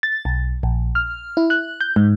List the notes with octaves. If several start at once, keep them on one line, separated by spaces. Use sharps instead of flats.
A6
B1
A#1
F6
E4
F#6
G6
G#2